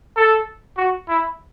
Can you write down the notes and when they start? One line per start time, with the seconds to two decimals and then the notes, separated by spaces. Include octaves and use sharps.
0.17 A4
0.77 F#4
1.09 E4